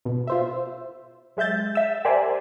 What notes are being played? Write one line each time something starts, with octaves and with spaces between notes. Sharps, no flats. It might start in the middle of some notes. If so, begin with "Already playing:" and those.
B2
F4 C5 E5
F#3 G#3 E5 G6 A6
E5 E6
G4 A#4 C5 D5 E5 G#5